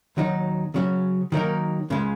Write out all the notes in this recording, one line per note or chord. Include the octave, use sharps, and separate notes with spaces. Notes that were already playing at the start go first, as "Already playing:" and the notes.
D#2 D#3 F#3 D#4
C#3 F#3 C#4
D#3 F#3 A#3 D#4 A#4
C#2 C#3 G#3